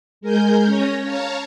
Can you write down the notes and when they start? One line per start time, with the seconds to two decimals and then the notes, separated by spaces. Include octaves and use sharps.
0.21 G#3 A#4 G#5 G6
0.65 C#4 C#5 A#6
1.03 C#5 F5 A5 A#5